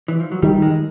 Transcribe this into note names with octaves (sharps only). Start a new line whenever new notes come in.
E3
F3
F#3
D#3 G3
G#3